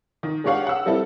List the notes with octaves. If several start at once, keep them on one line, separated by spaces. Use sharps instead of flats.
D#3
G#3 D4 G4 C#5 F5 F#5
F#5 E6
G3 C4 E4 A4